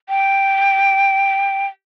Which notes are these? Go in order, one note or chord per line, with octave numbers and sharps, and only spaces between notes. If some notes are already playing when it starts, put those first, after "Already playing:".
G5